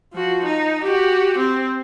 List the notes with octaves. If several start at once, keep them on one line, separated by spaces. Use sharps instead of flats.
F3 F#4
D#4
F#4 G4
C4